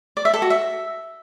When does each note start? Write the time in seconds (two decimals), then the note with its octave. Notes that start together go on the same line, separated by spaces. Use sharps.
0.17 D5
0.25 E5
0.34 A4
0.42 F#4
0.50 E5